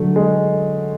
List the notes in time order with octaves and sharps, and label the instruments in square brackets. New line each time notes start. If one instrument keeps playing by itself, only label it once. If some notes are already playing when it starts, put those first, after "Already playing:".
Already playing: [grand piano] D3 F#3 [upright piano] A3
[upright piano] G#3